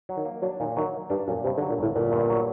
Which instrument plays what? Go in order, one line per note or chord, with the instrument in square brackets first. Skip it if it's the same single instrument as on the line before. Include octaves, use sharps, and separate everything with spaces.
[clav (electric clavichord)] F#3
[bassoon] D#3
[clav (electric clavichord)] A#3
[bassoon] F#3 [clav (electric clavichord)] D4
[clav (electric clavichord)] A#2 [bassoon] D#3
[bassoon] D#3 [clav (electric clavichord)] F#3
[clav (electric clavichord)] A#3
[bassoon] G2 [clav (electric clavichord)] D4
[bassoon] F#2 [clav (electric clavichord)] A#2
[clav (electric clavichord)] G2 [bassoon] C3
[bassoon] D3
[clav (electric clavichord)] F#3
[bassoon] A#2
[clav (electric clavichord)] G1 [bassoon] A2
[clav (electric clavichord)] G1 [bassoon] A#2
[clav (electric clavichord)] G2
F#3